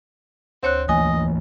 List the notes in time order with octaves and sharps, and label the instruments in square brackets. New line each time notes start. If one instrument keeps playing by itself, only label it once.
[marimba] D2 C#5 F#6 [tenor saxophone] C4
[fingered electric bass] E3 A3 A#3 [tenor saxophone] D#5 [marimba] G#5